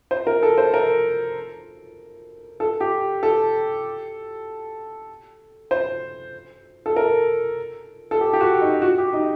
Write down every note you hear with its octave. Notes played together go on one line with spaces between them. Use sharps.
C5
A#4
A4
C5
A#4
A4
G4
A4
C5
A4
A#4
A4
G4
G4
F#4
D#4
F#4
G4
D#4